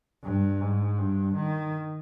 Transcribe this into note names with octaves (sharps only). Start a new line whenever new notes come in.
G2
G#2
G2
D#3